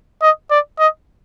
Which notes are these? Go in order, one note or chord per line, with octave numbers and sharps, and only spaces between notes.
D#5
D5
D#5